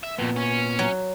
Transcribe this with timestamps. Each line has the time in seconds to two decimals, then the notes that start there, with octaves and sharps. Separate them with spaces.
0.04 E5
0.19 F2 A#2 B3
0.37 C#4
0.79 F#3